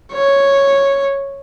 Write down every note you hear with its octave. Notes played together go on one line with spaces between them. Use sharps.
C#5